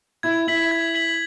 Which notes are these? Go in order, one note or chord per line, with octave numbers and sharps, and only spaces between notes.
E4 G#6
E4 B6 F#7
G#6
B6 F#7